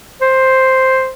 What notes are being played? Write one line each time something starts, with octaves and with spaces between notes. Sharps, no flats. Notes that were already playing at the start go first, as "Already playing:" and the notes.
C5